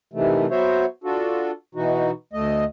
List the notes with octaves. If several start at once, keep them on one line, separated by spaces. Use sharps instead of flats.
C3 D#3 E3 A3
F#3 B3 F#4 C5 C#5 E5
D4 F4 F#4 A4
B2 E3 D#4 F#4
D2 A3 D#5